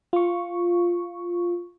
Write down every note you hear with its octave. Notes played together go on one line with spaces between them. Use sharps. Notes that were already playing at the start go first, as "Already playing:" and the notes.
F4 C#6